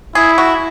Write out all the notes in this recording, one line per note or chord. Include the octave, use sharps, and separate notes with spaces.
E4 G#4
F#4